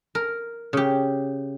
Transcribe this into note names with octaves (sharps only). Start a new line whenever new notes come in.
A#4
C#3 G4